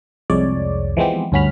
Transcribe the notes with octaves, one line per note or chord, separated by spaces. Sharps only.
C2 F2 G#3 C#5 D5
E3 F3 G#3 B3 C4 G4
D2 G2 C#4 F#4 B5 F6